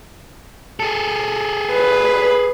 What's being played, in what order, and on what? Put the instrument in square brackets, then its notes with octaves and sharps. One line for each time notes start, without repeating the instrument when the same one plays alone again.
[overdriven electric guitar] G#4 A4
[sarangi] B4